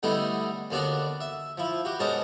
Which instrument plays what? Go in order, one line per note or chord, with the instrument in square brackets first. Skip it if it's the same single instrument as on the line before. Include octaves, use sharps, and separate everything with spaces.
[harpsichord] D3 G3 A3 B3 D#4 E4
D#2 D3 B3 D4 F#4 D5
E5
F3 E4
F#4 G4
G#2 B2 C#4 A#4 D#5 A5